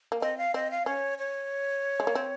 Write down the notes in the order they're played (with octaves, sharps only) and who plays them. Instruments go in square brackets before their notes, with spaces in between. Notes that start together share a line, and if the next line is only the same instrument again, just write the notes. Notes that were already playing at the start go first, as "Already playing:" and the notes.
[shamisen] A#3
[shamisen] C4 [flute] D#5
[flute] F5
[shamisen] C4 [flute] D#5
[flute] F5
[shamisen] C#4 [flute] C#5
[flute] C#5
[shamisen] G#3
A#3
C4